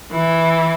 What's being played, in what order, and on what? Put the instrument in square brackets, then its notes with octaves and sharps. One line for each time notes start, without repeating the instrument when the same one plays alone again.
[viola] E3